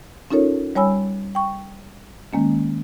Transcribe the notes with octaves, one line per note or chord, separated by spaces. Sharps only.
C#4 D#4 F4 A4 A#4 C#5
G3 C#5 G#5 B5 E6
G5 C#6
D#3 G#3 A#3 C#4